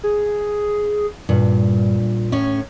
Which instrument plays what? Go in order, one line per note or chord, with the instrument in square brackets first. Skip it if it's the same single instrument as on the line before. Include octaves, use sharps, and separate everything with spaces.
[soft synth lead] G#4
[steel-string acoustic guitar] G2 [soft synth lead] A#2
[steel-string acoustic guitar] A2 C#4 C#5